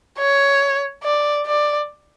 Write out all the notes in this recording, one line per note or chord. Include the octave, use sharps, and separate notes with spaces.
C#5
D5
D5